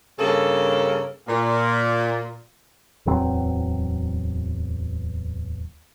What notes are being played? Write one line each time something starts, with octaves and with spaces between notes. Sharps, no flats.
G2 C#3 A#3 A4
A#2
D1 E2 F#3 C4